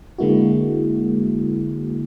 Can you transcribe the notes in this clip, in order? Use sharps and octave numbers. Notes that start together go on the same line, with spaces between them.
D3 G#3 A#3 E4 F#4